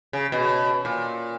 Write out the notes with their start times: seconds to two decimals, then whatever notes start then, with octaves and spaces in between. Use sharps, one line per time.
0.13 C#3
0.32 B2
0.85 A#2